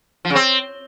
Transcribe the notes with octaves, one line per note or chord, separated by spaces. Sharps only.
F3
C#3
C4